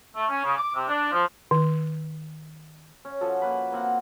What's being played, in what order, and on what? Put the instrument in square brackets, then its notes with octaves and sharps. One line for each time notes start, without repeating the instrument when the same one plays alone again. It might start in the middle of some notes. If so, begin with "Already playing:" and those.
[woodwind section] A3
C#4
C#3
D6
C3
D4
F3
[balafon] D#3
[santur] C#4
F3 F#4 A4
A#3 B4
A#3 C4 F#5